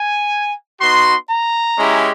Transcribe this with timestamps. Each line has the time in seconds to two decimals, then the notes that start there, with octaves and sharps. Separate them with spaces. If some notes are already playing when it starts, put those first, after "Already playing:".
Already playing: G#5
0.80 B3 D#4 F#4 C6
1.29 A#5
1.77 G#3 C#4 E4 G4